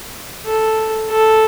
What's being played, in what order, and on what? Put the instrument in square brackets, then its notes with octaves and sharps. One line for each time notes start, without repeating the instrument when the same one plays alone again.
[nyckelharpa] A4
A4